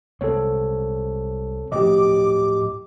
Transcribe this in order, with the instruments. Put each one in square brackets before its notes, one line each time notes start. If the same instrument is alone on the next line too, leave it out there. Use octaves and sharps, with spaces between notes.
[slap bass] C2 G#3 C4 [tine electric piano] A4 C#5
[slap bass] A2 F3 F#3 [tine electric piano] G4 D#5 [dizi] D6